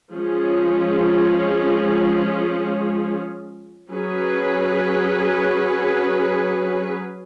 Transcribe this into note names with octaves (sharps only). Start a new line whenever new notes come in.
F3 G#3 C#4 G#4
F#3 C#4 G#4 B4